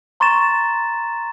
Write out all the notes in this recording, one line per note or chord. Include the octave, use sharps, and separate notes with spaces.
A#5 C6 C#6 A6 E7